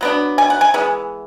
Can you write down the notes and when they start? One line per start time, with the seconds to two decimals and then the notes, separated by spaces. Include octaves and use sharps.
0.01 F#3 B3 D4
0.38 G#5
0.50 F#5
0.61 G#5
0.74 E3 G#3 B3